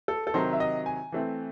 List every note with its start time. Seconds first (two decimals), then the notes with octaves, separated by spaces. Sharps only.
0.08 A4
0.27 A4
0.34 C3 D#3 F#3 C5
0.53 E5
0.60 D#5
0.86 G#5
1.12 E3 A3 C4